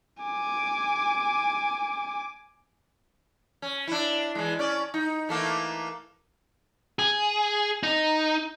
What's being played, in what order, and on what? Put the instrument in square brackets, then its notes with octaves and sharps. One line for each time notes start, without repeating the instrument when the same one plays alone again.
[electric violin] G#5 D6
[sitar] C#4
D4 E4
E3 G#3
C#4 D5
D#4
E3 A3 A#3
[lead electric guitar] G#4
D#4